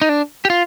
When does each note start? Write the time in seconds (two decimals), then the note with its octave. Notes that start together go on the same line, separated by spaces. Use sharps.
0.02 D#4
0.09 D4
0.45 G4
0.50 F4